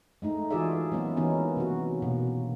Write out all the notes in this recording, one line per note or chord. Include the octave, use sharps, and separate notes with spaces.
G#3 A3 D#4
E3 F4 F#4 G#4 D5 E5
F#3 G#3 A#3 B3 C#4
D#3 E3 B3 C#4 D#4
C3 A#3 F#4
B2 A#3